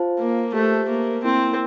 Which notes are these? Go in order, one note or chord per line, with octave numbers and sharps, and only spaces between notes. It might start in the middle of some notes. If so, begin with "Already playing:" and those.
Already playing: F4 C5 F5 A5
A#3
A3 G4 C5 E5 A5
A#3
A#3 C4 E4 A#4